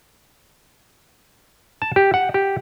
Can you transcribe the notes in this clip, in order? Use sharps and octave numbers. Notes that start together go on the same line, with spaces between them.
A5
G4
F#5
G4